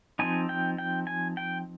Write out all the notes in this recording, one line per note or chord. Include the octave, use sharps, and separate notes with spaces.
F3 C4 D#4 G#5
G5
G5
G#5
G5